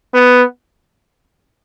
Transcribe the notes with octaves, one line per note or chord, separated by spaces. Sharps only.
B3